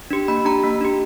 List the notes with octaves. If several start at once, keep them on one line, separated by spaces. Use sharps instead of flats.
D4 G4
A#3 B5
D4 G4 A#5
A#3
D4 G4